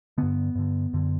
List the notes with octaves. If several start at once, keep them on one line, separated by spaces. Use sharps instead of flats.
G2 D3 B3
G2 D3
F#2 D3